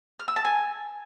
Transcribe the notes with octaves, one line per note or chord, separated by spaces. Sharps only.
F6
E6
A5
G#5